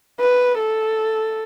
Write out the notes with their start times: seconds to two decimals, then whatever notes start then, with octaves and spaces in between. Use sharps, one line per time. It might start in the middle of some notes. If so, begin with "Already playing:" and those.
0.20 B4
0.59 A4